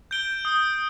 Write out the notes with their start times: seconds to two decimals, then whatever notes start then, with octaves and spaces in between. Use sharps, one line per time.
0.11 G6 D7 G7
0.45 D#6